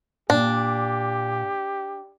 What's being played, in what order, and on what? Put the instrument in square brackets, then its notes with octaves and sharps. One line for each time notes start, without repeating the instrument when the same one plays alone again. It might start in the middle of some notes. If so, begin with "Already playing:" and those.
[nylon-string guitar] A#2 [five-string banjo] D4 [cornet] G4